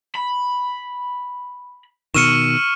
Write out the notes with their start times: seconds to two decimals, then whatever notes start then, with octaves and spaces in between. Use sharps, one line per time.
0.15 B5
2.14 B2 D#3 C#6 E6 F6 C#7 D#7 E7